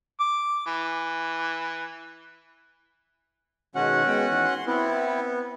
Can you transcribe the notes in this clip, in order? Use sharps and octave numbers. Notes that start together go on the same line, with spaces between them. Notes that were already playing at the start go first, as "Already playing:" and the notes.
D6
E3
B2 D#3 G#3 C#4 F#4 F#5
G#3 B3 G5
D#3 E3
C6
B3 C4 E4